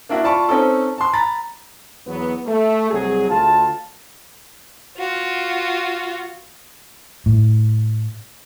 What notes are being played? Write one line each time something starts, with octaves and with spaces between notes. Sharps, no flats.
A#3 D4 E4 F#4
F4 D5 A5 B5 C#6
C4 C#4 D#4 A4
A5 C6
A#5 B5 A6
E2 F#3 B3
A3
C2 F#3 G#4
D2 F4 A5
F4 F#4
A2